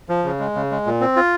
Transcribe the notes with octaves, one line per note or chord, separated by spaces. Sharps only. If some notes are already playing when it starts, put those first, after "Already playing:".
F3
C#3
G#3
C#3
G#3
A#2
C4
F4